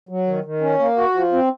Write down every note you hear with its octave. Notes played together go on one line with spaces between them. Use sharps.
F#3
D#3
D#3
C#4
A#3
F#4
F3
C4